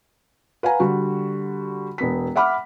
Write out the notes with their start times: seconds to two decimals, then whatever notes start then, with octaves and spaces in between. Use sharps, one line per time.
0.63 B4 F5 F#5 G#5 A#5
0.80 D3 G3 F#4
1.98 E1 B3 B6
2.36 E5 F#5 B5 D6 F6